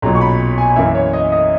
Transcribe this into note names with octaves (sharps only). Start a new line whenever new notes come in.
B1 A#2 F#3 A#5
C#6
B5
G#5
F#2 E3 A#3 C#4 E5
C#5
D#5
D#5